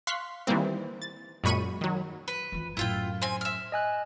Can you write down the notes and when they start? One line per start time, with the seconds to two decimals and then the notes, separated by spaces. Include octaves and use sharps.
0.07 F5 C6 C#6 F#6 B6
0.47 D#3 E3 G3 A#3 C4
1.02 A6
1.44 F#2 A#2 G#3 B5 C#6 D#7
1.81 D#3 F#3
2.28 B4
2.52 F2 E3
2.77 F#2 A2 E4 F4 G5
3.22 C4 G#5
3.41 E5 F6
3.72 D#5 G#5 F#6